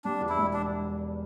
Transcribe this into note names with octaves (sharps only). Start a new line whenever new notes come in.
G3 D4
E2
E4
E1
D4